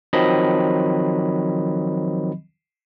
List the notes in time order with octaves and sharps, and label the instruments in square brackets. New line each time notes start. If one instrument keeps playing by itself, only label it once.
[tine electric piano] D#3 F3 F#3 C4 D#5 B5